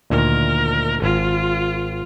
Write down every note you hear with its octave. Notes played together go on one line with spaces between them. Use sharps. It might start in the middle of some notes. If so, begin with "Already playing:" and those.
D2 A#2 D#3 A#4
G#1 F4